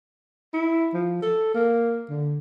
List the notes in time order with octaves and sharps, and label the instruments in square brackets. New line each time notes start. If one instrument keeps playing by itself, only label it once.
[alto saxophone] E4
F3
A4
A#3
D3